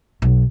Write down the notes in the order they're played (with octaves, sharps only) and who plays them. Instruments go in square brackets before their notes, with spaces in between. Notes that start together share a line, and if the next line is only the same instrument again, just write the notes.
[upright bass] B1